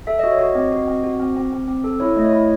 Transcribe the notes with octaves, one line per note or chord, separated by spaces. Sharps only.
A4 E5
F#4 D#5
C#5
F#4 D#5
C4
F#4
C4
F#4
C4
C4
C4
C4
A4
E4 C#5
A3 D#5
C#5
E4